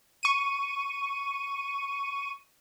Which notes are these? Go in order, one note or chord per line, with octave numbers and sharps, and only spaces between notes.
C#6 D#7